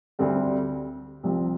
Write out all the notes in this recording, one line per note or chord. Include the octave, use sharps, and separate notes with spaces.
D2 D3 G3 C4
C2 C3 F3 C4